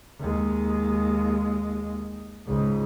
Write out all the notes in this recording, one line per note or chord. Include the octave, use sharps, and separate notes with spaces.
D#2 G#3
C#2 G#2